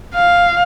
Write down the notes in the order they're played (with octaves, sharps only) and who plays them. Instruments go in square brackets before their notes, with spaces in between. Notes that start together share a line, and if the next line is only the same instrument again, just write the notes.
[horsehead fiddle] F5